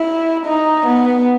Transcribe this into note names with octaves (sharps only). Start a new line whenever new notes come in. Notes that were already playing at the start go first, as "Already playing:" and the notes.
Already playing: E4
D#4
B3